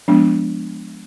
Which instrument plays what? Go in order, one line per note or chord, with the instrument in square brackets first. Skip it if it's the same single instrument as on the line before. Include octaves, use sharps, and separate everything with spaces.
[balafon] F3 G#3 B3 D4